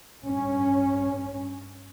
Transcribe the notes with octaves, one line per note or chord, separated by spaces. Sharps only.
G2 C#4